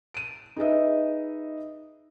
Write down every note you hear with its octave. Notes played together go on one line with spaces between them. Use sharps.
D7 D#7
D#4 G#4 B4 D#5 E5